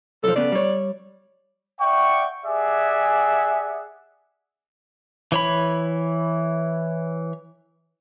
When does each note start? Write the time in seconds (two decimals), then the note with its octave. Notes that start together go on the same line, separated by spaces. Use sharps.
0.24 B1 F3 A4
0.36 C#3 B3 D5
0.52 G3 C#5
1.80 D5 E5 F#5 G5 C#6
2.45 G4 G#4 D5 E5 F#5 G#5
5.32 E3 C#5 B5